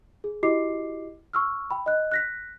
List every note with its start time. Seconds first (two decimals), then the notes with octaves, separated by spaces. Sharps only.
0.24 G#4
0.43 E4 F#4 G4 D#5 D6 C7
1.33 C#6 E6 F6
1.70 G5 B5
1.86 D#5 F#6
2.12 F#6 A#6 B6